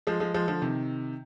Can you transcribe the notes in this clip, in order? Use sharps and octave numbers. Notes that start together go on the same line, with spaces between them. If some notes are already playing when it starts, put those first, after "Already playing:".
F3 G#3
F3 G#3
F3 G#3
D3 F3
C3 D#3